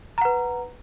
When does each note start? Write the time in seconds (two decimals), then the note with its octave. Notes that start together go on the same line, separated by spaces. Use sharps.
0.18 A#5
0.21 F#5
0.25 B4